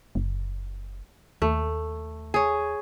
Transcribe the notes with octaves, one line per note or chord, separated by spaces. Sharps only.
F#1
D#2 A3
G#4 C#5